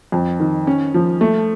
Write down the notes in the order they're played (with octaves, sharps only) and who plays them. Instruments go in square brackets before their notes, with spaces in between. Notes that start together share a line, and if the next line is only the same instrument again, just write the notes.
[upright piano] F2
D#3
C#4
F3
A3